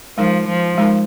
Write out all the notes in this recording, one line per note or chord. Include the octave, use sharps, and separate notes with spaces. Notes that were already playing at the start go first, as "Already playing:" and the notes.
F3 G#3 D#4 A#4
F3
G#3 D#4 A#4